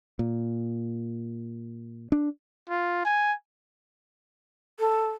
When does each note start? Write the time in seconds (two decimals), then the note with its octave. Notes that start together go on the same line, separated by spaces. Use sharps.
0.19 A#2
2.12 D4
2.70 F4
3.05 G#5
4.79 A4